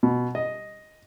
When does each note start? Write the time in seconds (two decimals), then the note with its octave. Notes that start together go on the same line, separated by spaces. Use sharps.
0.03 B2
0.35 D#5